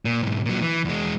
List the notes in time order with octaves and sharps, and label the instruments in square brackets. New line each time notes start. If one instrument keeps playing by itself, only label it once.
[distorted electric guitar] A#2
B1 G#2
A#2 F#3
E3
E2 G#3